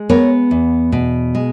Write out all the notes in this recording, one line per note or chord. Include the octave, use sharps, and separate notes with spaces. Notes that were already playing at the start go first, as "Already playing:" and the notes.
Already playing: G#3
B3 A#4 C#5
E2
B2
G#3